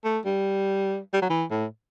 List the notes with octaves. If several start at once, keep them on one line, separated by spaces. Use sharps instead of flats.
A3
G3
G3
F#3
E3
A2